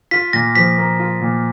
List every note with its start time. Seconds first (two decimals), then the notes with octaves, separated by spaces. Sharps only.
0.11 F4 B6
0.33 A#2 A#6
0.55 F3 B6
0.78 A#3
0.99 F4
1.21 A#2